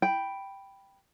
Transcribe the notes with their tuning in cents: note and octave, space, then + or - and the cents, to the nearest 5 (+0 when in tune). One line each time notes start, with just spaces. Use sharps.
G5 +0 B5 +0